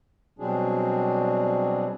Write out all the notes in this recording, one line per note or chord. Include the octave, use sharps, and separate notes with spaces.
B2 F#3 G3 C4 D4 G#4